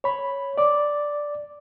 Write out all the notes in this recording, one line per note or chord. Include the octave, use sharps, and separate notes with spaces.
C#5 B5
D5 D6